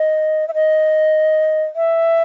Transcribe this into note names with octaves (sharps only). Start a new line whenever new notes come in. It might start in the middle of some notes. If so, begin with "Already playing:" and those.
Already playing: D#5
E5
D#5
E5